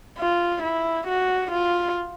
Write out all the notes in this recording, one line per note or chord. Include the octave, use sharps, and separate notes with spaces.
F4
E4
F#4
F4